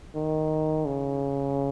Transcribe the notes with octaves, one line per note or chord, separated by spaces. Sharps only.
D#3
C#3